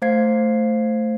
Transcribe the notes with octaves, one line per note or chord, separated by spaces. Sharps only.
A3 C5 F5 G#6 C7